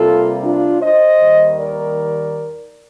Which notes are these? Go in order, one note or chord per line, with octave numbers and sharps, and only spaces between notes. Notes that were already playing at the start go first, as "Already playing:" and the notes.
Already playing: C3 G3 A#3 F4 A4
D4 F4
C5 D#5
D#2 D#3 G3
A#4 D5